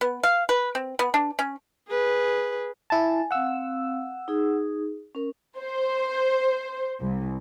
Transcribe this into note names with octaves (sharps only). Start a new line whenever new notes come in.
B3
F5
B4
C4
B3
D4
C#4
G#4 B4
E4 G#5 A5
C4 F5 F#5 E6
D#4 G#4
C#4 A#4
C5
C2